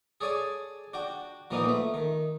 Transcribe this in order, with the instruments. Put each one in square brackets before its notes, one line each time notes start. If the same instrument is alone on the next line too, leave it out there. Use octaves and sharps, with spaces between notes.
[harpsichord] G#4 A4 C#5 D5 G#5
D4 F#4 G5
A#2 E3 F3 A#3 B3 D#4
A3 E5
D#3